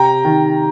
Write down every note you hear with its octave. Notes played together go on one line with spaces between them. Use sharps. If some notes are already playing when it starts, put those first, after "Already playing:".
Already playing: C3 G5 A#5
D#3